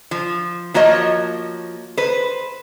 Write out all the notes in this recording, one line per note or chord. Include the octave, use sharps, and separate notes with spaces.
F3
F3 A#3 F#4 C#5 D#5
B4 C5